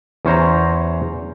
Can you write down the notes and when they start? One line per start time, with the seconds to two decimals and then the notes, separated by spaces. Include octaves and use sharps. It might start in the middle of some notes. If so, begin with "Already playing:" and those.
0.25 E2 C#4 C5 A#5